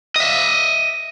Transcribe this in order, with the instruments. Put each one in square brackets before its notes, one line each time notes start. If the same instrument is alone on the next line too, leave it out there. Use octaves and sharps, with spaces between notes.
[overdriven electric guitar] D#5 E5